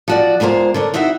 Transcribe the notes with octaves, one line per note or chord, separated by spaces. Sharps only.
F3 F#4 D5
D2 G#3 A#3 F4 C5
D3 A#4 C#5
C4 D#4 E4 F#4 E5